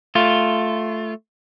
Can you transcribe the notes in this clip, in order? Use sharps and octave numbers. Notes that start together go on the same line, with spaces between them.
A3 F4